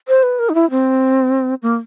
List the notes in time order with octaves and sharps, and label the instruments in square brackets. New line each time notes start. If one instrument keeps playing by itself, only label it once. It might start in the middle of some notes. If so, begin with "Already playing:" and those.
[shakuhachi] C5
B4
A#4
D#4
E4
C4
A#3